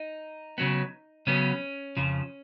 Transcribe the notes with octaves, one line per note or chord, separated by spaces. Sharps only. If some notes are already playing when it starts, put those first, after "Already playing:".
Already playing: D#4
C#3 F#3 B3
C#3 F#3 B3 C#4
F2 C#3 F3